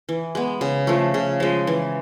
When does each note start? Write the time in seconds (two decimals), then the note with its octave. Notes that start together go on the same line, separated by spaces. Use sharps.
0.09 E3
0.35 G#3 B3
0.61 C#3
0.87 F3 A3
1.14 C#3
1.40 F3 G#3
1.67 E3